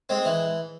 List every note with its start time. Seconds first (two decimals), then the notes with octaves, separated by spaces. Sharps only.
0.09 G#3 C4
0.25 E3